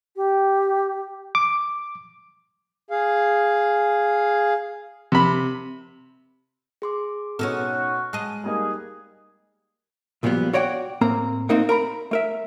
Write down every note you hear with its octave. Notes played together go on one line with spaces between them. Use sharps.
G4
D6
G#4 F5
C3 B5
G#4 C6 D6
B2 C#4 D#4 F#4 A4 F6
G#3 D#5 A5 F#6
G3 A#3 D#4 G#4
B1 A#2 F3 G3 B3
F#4 C#5 D5 F#5 G5
A2 A#3 C4 A#4 A#5
A3 A#3 C4 D#4 A#4 F#5
A#4 A#5 B5
A3 A#4 E5